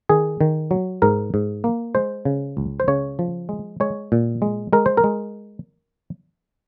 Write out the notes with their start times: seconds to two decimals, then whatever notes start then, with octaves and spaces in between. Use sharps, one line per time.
0.09 D#3 G#4
0.41 D#3
0.71 F#3
1.02 G#2 A#4
1.34 G#2
1.64 A#3
1.95 G#3 C5
2.25 C#3
2.57 C#2
2.80 C5
2.88 C#3 C#5
3.19 F3
3.49 G#3
3.80 G#3 C#5
4.12 A#2
4.42 G#3
4.73 G#3 A#4
4.86 C5
4.97 A#4
5.04 G#3